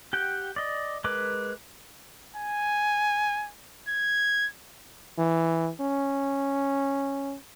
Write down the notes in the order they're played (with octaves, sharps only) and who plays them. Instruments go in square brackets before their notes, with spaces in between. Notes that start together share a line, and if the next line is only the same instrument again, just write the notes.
[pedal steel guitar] G4 F#5 G5
D5 D#5
G#3 A#4 B4 D6
[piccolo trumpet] G#5
G#6
[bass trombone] E3
C#4